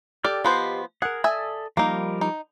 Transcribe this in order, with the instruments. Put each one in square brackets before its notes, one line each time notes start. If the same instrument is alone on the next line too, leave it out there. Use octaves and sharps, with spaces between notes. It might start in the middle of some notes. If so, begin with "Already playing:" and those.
[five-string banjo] G4 D5 [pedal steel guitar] A4 G5 F6
[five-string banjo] F3 B3 C5 [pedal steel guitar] G4 D#5 C6
[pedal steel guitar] G#4 A#4 [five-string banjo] F#5
[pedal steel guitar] A4 D5 D#6 [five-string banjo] E5 G#5
[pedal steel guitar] F3 G3 A#4 [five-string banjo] A#3 D#4
[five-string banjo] D#4